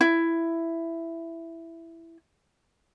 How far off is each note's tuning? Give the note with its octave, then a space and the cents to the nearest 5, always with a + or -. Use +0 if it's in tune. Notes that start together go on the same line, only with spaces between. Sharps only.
E4 +10